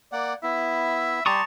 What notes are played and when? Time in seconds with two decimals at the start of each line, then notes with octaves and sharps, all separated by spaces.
0.12 A#3 D5 F#5
0.43 B3 E4 E5
1.26 G3 G4 A5 A#5 C6 C#6 D#6